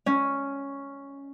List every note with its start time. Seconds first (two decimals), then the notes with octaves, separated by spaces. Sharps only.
0.06 C#4